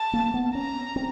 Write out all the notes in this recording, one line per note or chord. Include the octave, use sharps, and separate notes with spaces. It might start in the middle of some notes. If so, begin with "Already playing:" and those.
Already playing: A5
A#3
B3
C#4 A#5
C4